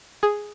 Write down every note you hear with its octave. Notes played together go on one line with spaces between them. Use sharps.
G#4